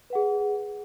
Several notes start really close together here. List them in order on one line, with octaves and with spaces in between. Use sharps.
B4 F#5 G#4